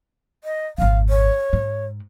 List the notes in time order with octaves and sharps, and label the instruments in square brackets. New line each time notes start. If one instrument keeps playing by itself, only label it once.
[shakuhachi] D#5
[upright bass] G#1 F2 [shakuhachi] F5
[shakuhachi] C#5
[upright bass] G#2